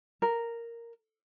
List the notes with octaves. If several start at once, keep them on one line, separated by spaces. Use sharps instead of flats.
A#4